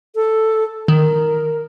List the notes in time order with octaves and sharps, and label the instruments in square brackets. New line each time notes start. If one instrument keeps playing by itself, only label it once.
[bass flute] A4
[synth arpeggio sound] D#3 [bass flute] A#4